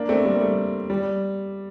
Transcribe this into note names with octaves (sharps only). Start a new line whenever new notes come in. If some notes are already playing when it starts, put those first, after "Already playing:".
Already playing: A#3 D4
A3 C4
G3 A#3
A3
G3